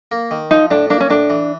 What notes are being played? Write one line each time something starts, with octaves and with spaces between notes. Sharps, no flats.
A#3
D#3
F3 D#4
A2 D4
A#3 D4
C#4
A2 D4
E3